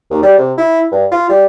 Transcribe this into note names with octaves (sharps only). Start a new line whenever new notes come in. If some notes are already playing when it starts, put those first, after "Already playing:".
D#2
G3
C3
E4
G2
F4
G3